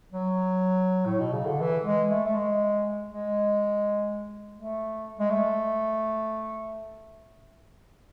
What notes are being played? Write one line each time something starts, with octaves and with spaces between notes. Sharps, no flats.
F#3
A2
B2
C#3
D3
E3
G#3
A3
A3
G#3
G#3
A3
G#3
A3